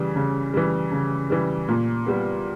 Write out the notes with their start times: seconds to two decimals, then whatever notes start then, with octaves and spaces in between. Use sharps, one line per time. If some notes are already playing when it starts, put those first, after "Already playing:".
Already playing: C#3 E3 G3
0.16 C#3
0.54 E3 G3
0.92 C#3
1.30 E3 G3
1.68 A#2
2.06 G3 B3